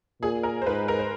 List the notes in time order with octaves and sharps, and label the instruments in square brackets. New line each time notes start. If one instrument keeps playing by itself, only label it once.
[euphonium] A#2 [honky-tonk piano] G#4
[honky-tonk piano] A#4
C5
[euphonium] G#2 [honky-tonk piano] B4
[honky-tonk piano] A#4
C5